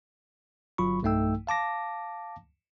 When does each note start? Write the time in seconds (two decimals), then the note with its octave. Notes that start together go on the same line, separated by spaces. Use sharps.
0.78 G1 F#3 F4 B5 C#6
1.03 B1 G2 A3 D#4 G5 E6
1.47 F5 A5 D6 A#6